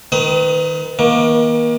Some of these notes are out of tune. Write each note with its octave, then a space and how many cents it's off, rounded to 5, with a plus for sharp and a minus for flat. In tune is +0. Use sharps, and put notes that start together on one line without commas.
D#3 +0 B4 +35 D#6 +35
D#3 +45 A#3 +35